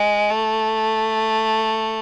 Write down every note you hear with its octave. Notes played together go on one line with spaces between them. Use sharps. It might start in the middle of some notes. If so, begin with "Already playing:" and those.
Already playing: G#3
A3